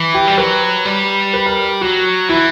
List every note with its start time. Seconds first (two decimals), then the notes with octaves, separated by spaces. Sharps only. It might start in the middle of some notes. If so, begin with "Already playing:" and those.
Already playing: E3
0.14 G4
0.28 G3
0.38 F#3 B4
0.85 G3
1.33 B4
1.46 A#4
1.81 F#3 F#4
2.29 E3 E4